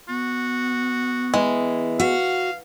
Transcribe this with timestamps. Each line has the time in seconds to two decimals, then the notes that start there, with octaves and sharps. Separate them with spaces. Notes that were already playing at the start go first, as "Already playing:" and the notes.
0.09 B3 F#4
1.34 E3 G#3
2.00 F#4 F5